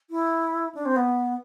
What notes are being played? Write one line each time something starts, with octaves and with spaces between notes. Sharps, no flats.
E4
D4
C4
B3